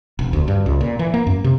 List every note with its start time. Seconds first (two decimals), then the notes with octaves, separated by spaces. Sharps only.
0.19 E1
0.33 D2
0.48 G2
0.66 C#2
0.81 A#2
0.99 E3
1.14 A#3
1.27 F#2
1.44 C3